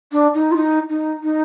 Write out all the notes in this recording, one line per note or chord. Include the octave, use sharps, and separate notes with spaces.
D4
D#4
F4
D#4
D#4
D#4